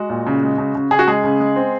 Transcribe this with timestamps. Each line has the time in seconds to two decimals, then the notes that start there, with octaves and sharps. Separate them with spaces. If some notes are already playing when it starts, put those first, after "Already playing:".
Already playing: G#3 F#4
0.10 A#2
0.27 C#3
0.43 G#3
0.58 C#3
0.75 C#3
0.91 C#3 G#4
0.99 F#4
1.07 G#3 G#4
1.24 C#3
1.40 G#3
1.56 C4